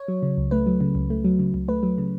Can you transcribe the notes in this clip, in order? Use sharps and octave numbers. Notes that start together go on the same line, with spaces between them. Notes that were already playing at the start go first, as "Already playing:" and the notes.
Already playing: C#5
F#3
C#3
C#2
A3 B4
F#3
C#3
C#2
A3
F#3
C#3
C#2
A3 B4
F#3
C#3